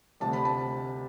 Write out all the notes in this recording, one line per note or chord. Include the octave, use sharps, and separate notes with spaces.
D2 C3 G3 A5
B5
A5